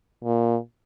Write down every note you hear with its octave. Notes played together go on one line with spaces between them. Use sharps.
A#2